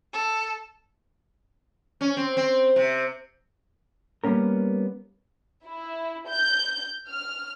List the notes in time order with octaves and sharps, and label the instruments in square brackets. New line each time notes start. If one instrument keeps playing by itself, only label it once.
[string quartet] A4
[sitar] C#4
C4
C4
C3
[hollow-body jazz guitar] G3 A#3 B3 C#4 A#4
[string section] E4
G6
F6